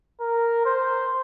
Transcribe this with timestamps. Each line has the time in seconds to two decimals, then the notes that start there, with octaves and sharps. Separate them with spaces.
0.21 A#4
0.65 C5